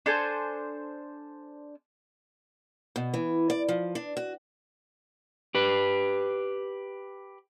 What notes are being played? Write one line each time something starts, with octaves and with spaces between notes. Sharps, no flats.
D4 A4 C5 G#5
B2
E3
D5
F3
D4
F#4
G4 B4